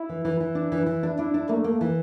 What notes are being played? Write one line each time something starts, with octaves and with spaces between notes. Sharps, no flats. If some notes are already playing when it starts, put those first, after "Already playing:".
Already playing: E4
E3
E3
E3
D4
E3
E3
D4
D4 E4
D4
A3 A#3
A#3
E3